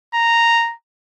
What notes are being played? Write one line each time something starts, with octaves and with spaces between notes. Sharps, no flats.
A#5